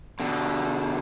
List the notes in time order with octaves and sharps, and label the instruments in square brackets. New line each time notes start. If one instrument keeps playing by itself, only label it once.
[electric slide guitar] B2 D3